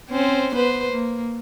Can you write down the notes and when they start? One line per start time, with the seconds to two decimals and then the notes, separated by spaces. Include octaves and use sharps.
0.10 C4 C#4 C5
0.55 B3 B4 C5
0.92 A#3